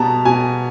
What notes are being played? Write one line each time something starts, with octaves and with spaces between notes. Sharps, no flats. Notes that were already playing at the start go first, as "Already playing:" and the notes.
Already playing: B2 G3 B3 A5 A#5
B2 G#5